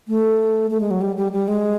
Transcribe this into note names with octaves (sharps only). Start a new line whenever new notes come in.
A3
A3
G#3
F#3
G3
G3
G3
G#3